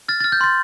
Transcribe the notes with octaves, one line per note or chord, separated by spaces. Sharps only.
F6 A6
A6
F6
G6
C6 A6